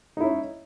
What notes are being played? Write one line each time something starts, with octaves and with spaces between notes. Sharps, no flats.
C#4 D#4 E4